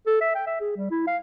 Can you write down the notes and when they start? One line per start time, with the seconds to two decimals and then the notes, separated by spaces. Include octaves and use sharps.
0.07 A4
0.21 E5
0.35 G5
0.47 E5
0.61 G#4
0.77 G3
0.91 E4
1.07 F5